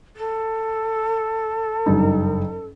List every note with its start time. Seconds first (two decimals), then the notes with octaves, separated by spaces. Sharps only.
0.16 A4
1.86 F#1 G2 D#4